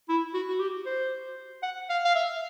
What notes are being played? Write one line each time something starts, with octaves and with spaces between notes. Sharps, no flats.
E4
F#4
F#4
G4
C5
F#5
F5
F5
E5